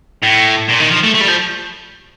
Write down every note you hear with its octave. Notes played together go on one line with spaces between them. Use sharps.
A2
A#2
D#3
F3
A3
A3
G3
F3